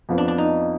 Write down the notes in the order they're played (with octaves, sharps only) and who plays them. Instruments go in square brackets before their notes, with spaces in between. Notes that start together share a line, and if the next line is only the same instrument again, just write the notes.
[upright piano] F2 F3 B3 F4
[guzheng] D4
D4
D#4